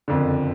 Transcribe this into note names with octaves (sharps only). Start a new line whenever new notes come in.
F#1 F2 D3